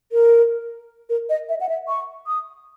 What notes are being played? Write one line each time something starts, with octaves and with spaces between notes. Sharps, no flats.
A#4
A#4
D#5
E5
F#5
E5
C#6
D#6